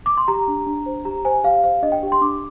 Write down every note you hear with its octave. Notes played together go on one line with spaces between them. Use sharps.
D6
C6
G4 A#5
D4
D4
C5
G4 A#5
C5 G#5
G4 F5
C5 F5
D4 D#5
G5
G4
C6
D4 D6